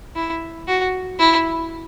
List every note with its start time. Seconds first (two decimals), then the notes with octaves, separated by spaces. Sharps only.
0.16 E4
0.68 F#4
1.19 E4